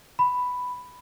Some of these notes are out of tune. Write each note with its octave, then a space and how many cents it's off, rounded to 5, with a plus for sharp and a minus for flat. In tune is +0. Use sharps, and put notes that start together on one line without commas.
B5 +5